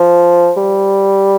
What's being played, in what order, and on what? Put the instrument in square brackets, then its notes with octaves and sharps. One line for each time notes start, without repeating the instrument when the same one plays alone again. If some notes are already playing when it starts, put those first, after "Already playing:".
Already playing: [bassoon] F3
G3